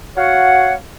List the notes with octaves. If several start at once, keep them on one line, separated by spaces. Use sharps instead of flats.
F#4 C#5 F5 F#5